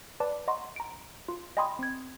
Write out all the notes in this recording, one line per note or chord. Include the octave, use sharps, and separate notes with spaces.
B4 D5 A5 D6
D#5 F#5 A#5 C6 C#6
A#5 D7
F4
D#5 G5 G#5 B5 C6 D#6
C4 G#6